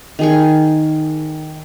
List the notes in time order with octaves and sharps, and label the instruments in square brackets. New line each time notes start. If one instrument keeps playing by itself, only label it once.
[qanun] D#3 G#4 C#6